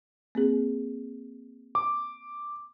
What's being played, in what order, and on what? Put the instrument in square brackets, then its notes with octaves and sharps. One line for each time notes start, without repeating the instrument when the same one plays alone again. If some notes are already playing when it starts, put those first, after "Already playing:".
[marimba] A#3 C4 G#4
[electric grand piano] D6